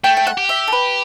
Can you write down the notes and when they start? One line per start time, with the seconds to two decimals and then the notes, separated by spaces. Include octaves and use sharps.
0.04 A3 G5
0.17 G5
0.27 F#5
0.38 G4
0.49 E5
0.68 A4
0.72 B4